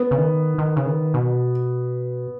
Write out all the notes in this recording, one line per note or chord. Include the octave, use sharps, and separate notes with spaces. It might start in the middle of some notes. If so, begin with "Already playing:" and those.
Already playing: B3
C#3
D#3
D#3
C#3
D#3
B2